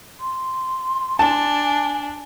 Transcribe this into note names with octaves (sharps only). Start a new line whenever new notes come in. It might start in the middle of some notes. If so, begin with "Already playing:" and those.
C6
D4 G#5 A5